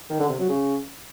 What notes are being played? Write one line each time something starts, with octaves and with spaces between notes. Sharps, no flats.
D#3
D3
C3
F#3
C#3